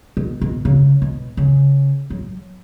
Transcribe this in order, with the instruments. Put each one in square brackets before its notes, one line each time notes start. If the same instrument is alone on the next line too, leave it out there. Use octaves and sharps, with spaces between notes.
[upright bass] B2
B2
C#3
B2
C#3
F#3